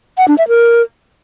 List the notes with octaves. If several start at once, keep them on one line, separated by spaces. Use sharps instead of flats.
F#5
D4
E5
A#4